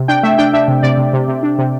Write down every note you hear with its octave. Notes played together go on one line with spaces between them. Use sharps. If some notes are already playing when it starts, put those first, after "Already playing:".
Already playing: C3
D4 G5
A3 E5
D4 G5
D4 E5
C3
C3 D5
C3
C3
C3
D4
C3